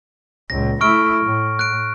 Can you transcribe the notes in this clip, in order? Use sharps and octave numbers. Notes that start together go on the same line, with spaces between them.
C#2 A#2 A#6
A3 E4 C#6 F6 D7
A2
F#6 D7